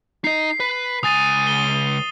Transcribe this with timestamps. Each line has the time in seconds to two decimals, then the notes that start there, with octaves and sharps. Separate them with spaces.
0.24 D#4 D#5 C7
0.60 B4
1.03 C#2 G#5 D#6 A6 D#7
1.47 G7